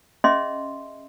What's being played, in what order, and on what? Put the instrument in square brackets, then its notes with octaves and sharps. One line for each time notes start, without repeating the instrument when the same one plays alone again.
[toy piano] C#4 G#4 D#5 E5 C6